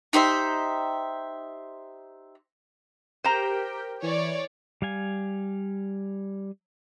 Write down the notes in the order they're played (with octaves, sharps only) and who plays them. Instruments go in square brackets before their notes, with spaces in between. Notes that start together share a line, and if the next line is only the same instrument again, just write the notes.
[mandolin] D#4 G4 C5 E5
[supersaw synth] G4 A#4 G5 [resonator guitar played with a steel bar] C5 A#5
[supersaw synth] E3 [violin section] C#5 D5
[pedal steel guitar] G3 F5 G#5